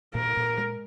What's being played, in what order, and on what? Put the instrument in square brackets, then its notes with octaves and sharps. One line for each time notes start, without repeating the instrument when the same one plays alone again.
[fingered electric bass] A#2 [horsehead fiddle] A#4
[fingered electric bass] A#2
G#3